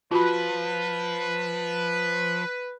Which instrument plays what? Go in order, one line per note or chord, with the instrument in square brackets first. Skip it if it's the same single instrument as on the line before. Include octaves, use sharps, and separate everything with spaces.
[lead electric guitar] F3 [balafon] F4 F#4 B5 [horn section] B4